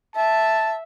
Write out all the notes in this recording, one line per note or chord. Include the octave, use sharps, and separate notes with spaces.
E5 A5